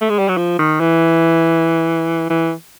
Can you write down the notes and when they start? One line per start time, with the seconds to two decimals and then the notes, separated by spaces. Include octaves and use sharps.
0.01 A3
0.10 G#3
0.19 G3
0.29 F#3
0.37 F3
0.59 D#3
0.80 E3
2.30 E3